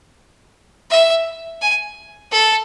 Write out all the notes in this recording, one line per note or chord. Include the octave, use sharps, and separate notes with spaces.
E5
G#5
A4